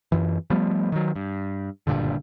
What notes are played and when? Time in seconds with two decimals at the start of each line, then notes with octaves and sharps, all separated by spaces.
0.12 F#2 E3
0.50 F3 G3 A3 B3
0.92 D#3 F#3
1.15 G2
1.87 F#1 G2 A#2 D3